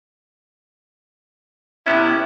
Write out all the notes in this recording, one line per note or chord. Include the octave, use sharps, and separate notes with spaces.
C3 B3 C#4 E4